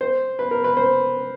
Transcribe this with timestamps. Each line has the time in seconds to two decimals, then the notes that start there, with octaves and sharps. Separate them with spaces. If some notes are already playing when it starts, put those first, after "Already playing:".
0.01 C5
0.39 B4
0.51 A#4
0.64 B4
0.77 C5